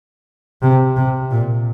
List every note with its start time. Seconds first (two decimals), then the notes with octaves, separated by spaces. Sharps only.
0.62 C3
0.96 C3
1.31 A#2